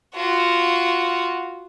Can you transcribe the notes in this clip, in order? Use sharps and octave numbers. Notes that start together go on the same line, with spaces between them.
F4 F#4